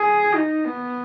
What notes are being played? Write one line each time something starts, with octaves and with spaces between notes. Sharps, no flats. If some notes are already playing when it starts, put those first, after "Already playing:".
Already playing: G#4
D#4
B3